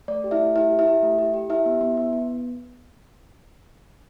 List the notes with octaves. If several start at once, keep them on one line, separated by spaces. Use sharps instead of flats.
A3 D5
G4
E4 E5
A3
E4 G4 E5
G4
E4 E5
G4
A3
G4
G4
E4 G4 E5
B3
B3
B3
B3